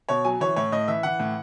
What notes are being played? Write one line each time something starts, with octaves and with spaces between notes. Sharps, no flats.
B2 C#5
F#3 G#5
E3 C#5
A2 C#5
A2 D#5
E3 E5
E3 F#5
A2